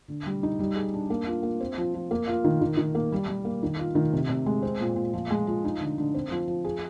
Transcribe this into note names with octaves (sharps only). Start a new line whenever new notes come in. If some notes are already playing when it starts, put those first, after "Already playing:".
D3
G3
D#4
G3
G#4
D4
A#3
F4
A#3
C4
F3
F3
A#3
F4
D#3
D#3
D#3
A#3
G3
G3
A#3
D#3
F4
D#3
C3
C3
G#3
C4
A#2
A#2
F3
G#3
F3
D#4
D3
D3
C4
F3
F3
G#4